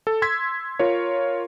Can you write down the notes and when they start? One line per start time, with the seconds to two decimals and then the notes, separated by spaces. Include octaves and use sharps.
0.07 A4
0.22 C6 E6 G#6 B6
0.79 F4 A#4 C#5